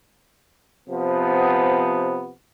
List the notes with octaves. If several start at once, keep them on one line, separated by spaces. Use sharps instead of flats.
C3 F3 B3